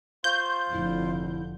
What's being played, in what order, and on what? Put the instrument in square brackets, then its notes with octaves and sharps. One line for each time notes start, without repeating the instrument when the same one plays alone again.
[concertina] F4 C5 [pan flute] C#6 [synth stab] G6
[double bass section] F1 F2 D3 [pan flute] E4